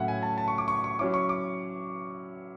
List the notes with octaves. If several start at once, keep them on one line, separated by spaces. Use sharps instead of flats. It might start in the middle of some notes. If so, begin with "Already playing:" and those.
Already playing: A2 F#3 C#4 E4 E5 F#5
G#5
A5
A5
C#6
D6
C#6
C#6
F#3 C#4 E4 D6
C#6
D6